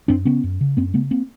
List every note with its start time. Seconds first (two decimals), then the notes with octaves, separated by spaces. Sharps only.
0.08 F#2 C4 D4
0.25 C#3 B3 C#4
0.43 F#2
0.61 C#3
0.77 F#2 A#3 C4
0.94 C#3 A3 B3
1.11 A#3 C4